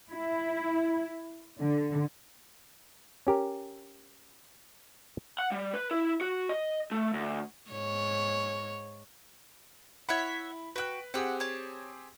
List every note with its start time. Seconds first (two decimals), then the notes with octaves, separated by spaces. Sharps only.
0.11 E4
1.58 D3
3.27 C#4 G4 A#4
5.39 F#5
5.52 G3
5.74 B4
5.91 E4
6.21 F#4
6.49 D#5
6.91 A3
7.13 D2
7.71 G#2 C#5
10.09 E4 C#5 E5 F#5 B5
10.76 F#4 B4 G5 F#6
11.14 C4 G4 G#4 F#5 E6
11.40 C#5 A5